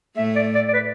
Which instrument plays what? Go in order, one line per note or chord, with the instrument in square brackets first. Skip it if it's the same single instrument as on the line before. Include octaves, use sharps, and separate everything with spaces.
[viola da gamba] A2 A3 [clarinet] E5
[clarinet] D5
D5
D5
B4